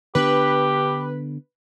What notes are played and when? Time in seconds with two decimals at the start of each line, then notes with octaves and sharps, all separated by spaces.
0.15 D3 B3 D4 G4 B4